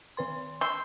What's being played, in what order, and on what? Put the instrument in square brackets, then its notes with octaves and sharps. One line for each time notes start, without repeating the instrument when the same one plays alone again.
[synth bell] D#3 B4 C6
[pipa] C6 [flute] E6 [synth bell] G6